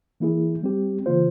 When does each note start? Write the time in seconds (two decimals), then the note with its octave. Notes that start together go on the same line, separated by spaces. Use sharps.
0.20 E3 A#3 E4 G#4
0.63 G3 C4 G4
1.06 C#3 E3 A#3 F4 C5